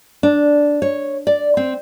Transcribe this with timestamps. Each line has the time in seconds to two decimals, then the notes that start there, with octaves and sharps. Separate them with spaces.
0.23 D4
0.82 C#5
1.27 D5
1.57 C4